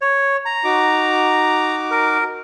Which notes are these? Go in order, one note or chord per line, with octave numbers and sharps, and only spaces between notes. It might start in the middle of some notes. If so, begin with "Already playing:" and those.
C#5
A#5
D#4 F#4 D6
A#4